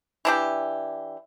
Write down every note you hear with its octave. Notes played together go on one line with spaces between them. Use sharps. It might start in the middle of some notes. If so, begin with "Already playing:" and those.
E3 D4 G4